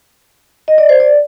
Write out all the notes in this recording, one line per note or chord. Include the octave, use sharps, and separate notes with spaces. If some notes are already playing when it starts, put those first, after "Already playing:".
D#5
D5
C5
D5